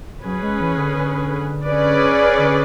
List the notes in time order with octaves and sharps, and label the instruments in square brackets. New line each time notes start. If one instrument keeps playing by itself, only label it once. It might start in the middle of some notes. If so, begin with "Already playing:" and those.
[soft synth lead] F#3 [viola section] C#4 G#4 B4
[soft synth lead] G#3
E3
D3
D3
[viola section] C#4 G#4 B4 D5
[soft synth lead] D3